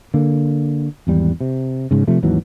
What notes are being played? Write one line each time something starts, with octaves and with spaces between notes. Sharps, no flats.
D3 A#3
G#1 E2 G3
C3
G#2 C#3
C3 F3 A3
G#1 D#2 E3 F#3